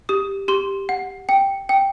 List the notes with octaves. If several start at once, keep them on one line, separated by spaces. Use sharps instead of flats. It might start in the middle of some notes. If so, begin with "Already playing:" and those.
G4 D#6
G4 C6
F#5
G5
G5